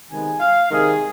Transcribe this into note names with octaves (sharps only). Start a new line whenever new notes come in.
C3 D#3 G#3 B3 G#5
F5
C3 D#3 G#3 G#4